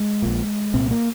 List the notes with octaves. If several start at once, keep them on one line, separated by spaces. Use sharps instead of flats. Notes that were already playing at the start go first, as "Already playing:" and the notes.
Already playing: G#3
A#1 A#2
C2 A#2 C4
A#3